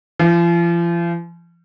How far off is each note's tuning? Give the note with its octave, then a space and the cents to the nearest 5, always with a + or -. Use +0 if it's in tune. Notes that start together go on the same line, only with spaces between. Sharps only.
F3 -40